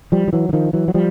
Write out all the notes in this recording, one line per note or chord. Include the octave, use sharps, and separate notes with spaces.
F3 G3
F3
E3 F#3
E3
D#3 F3
E3 F#3
F#3
F3 G3